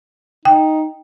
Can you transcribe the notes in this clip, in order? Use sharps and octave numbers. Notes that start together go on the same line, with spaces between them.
D#4 G5